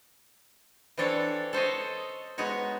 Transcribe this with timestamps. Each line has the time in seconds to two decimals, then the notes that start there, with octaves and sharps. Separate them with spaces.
0.98 E3 C4 D4 A4 C#5
1.53 A4 C5 C#5 D#5
2.38 G#3 B3 D#4 F#4 C#5